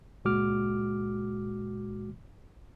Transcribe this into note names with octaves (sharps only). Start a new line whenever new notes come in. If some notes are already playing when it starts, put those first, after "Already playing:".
C#2 A#2 G#3 F#4 D6 F6